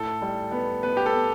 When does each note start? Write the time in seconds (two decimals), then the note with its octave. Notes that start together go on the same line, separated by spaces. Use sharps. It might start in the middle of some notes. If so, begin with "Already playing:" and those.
Already playing: A2 A4
0.22 G3
0.52 B3
0.83 B3 B4
0.97 G4
1.06 A4
1.13 B3